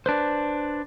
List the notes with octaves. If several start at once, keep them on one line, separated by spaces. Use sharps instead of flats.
D4 B4 C5